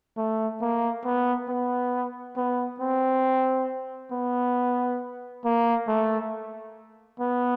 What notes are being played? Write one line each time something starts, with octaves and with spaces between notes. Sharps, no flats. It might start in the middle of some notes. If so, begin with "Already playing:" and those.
A3
A#3
B3
B3
B3
C4
B3
A#3
A3
B3